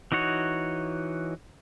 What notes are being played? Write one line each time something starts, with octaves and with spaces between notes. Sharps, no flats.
E3 D#4 F#4 C#5